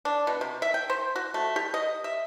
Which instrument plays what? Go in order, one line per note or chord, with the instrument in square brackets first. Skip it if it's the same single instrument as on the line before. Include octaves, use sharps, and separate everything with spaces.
[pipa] D4
B2
C3
E5
G5
C5
F#4
A3
G4
D#5
E5